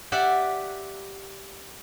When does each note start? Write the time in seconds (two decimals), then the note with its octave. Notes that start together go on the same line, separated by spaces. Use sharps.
0.12 G4 D5 E5 F#5